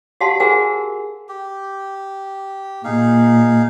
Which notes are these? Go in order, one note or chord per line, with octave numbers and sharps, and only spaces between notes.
F#4 G4 F5 F#5 A5 C6
F#4 G#4 A#4 C5 F#5 G#5
G4
A#2 D#4 G#4 F5